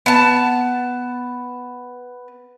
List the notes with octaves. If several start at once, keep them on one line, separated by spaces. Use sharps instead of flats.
B3 A5